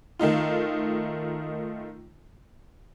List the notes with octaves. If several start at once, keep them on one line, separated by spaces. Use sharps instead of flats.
D#3 A3 D#4 F4